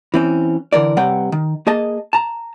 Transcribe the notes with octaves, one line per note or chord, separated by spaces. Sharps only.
E3 C4 C#4
D3 E3 A#4 D5
C3 G3 B4 C#5 F#5 G5
D#3
A#3 G#4 D#5 A5
A5 A#5